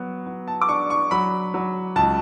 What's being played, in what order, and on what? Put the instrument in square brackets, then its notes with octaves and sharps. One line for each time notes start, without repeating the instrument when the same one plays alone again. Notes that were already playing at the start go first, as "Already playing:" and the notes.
Already playing: [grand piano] F#3 B3
B3
A5
D6
D4 C#6
C#6
F#3 B5
F#3
C#2 A5